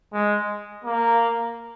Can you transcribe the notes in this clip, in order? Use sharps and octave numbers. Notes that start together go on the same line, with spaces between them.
G#3
A#3